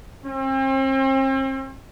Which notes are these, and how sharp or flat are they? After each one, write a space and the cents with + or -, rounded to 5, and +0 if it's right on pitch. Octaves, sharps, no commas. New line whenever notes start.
C4 +40